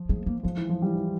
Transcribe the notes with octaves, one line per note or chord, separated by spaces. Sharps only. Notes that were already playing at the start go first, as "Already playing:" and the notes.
Already playing: F3
G#3
A#3
F3 G#3
E3
F3
E3 G3
E3